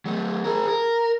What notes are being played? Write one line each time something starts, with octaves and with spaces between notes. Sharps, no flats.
F#3 A3
G#4 A#4
A#4